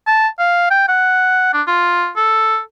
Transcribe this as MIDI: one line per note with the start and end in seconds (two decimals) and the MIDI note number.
0.07 0.28 81
0.39 0.66 77
0.71 0.84 79
0.88 1.52 78
1.53 1.62 62
1.67 2.08 65
2.16 2.59 69